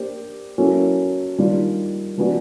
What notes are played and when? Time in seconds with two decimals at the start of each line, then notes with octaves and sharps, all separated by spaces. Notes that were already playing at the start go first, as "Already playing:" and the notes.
Already playing: A#3 D4 G4 C5
0.58 F#3 A#3 C#4 E4 A4
1.38 D#3 G3 A#3 D4 F4
2.18 F3 G#3 B3 D4 F#4